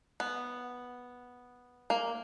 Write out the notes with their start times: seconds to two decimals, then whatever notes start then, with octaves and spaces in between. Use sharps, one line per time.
0.20 B3
1.90 A#3